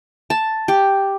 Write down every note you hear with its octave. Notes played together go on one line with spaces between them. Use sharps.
A5
G4